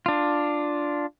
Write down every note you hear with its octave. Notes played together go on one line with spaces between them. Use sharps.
D4 F4